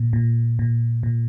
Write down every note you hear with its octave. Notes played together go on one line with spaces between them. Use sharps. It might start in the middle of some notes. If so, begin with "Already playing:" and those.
Already playing: A#2
A#2
A#2
A#2